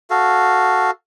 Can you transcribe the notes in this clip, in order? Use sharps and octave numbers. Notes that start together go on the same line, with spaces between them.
F#4 A4 F5